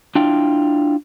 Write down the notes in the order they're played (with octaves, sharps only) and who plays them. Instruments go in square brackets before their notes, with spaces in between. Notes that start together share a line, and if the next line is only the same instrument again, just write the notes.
[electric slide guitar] D4 E4 F4 G5